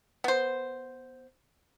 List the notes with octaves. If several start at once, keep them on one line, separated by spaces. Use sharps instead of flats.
B3 C5